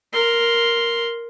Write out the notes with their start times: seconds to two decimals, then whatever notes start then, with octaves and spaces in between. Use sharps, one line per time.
0.13 A#4 C6